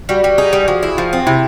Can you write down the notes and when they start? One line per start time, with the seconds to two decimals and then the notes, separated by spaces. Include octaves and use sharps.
0.09 G3 F#4
0.23 G3 G4
0.38 D#4 G#4
0.53 G3
0.68 F3 F#4
0.83 E4
0.97 F3 F4
1.13 C4
1.27 C3 E4